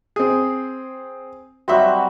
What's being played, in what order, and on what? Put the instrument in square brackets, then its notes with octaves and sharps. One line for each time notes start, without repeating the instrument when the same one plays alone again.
[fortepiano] C4 G#4
[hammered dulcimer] F#3 G3 C4 [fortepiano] F#4 E5